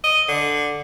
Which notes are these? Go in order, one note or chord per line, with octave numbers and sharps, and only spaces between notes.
D#5
D3